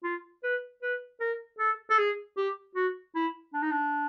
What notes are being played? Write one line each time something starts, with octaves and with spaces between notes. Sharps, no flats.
F4
B4
B4
A#4
A4
A4
G#4
G4
F#4
E4
D4
D#4
D4